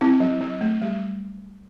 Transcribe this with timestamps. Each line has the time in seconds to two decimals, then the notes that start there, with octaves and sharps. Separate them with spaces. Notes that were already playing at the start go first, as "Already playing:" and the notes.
0.01 C4 E4
0.20 F#3
0.41 F#3
0.61 A3
0.82 G3